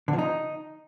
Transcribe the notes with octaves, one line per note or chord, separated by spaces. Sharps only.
D3
F3
D#4